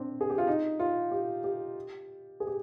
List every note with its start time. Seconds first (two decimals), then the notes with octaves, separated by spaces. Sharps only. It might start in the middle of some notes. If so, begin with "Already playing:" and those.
Already playing: C4 D4
0.21 G#4
0.30 G4
0.38 F4
0.47 D#4
0.79 F4
1.11 G4
1.44 G4
2.40 G#4
2.47 G4